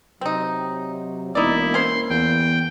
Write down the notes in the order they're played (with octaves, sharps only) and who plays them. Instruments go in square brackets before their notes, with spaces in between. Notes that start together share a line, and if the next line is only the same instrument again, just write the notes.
[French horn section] C3 F#3 [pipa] C4 D#4
[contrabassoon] E1 [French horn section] A#3 [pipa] D#4 D5 [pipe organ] E4
[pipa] C#4 C5 [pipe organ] C6
[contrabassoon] E2 [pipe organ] G5